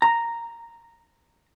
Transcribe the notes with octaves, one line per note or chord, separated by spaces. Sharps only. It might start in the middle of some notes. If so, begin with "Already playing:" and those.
A#5